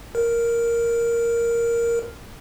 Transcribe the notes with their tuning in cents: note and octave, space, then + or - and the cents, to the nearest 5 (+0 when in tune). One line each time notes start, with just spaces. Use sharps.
A#4 +0